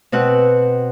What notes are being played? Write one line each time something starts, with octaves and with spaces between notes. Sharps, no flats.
B2 C4 F#5 F#6